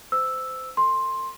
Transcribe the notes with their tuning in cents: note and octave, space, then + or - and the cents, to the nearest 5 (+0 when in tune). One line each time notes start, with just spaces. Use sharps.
C5 -30 E6 +0
A#4 -45 C6 +10